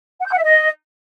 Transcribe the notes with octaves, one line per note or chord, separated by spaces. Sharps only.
F#5
G6
F#5
E5
D#5